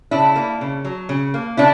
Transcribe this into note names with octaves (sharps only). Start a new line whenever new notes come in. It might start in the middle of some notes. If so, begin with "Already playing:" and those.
C#3 D4 E4
A#3
C#3
F#3
C#3
A#3
C#3 D4 E4